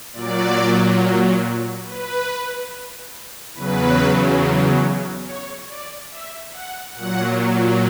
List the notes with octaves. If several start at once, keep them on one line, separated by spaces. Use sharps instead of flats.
A#2 F#3 D5
B4
E2 C#3 F#3 B4
C#5
D5
E5
F#5
A#2 F#3 F#5